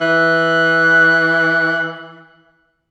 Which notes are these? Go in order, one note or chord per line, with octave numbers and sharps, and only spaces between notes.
E3 F#6